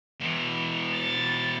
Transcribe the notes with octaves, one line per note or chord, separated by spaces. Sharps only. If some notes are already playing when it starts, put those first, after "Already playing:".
B2 E3
A6